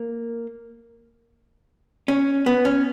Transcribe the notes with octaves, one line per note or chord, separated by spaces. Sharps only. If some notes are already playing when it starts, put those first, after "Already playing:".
Already playing: A#3
C#4
B3
C#4